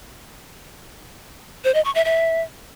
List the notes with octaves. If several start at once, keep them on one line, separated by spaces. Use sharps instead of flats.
C5
D#5
C#6
E5
E5